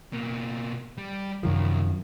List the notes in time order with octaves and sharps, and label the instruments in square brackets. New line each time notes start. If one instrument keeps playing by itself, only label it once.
[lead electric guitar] B2 A#3
G3
[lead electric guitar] C2 [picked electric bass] F#2 D#3 F3